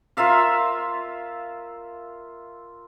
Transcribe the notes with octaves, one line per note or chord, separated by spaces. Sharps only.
F4 A#4 E5 F5